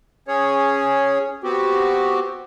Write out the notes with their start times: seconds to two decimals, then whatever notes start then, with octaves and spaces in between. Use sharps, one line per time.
0.28 C#4 G#4 C#5
1.43 B3 C4 F#4 G4